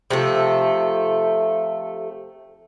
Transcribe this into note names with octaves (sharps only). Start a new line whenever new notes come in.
C3 F3 A3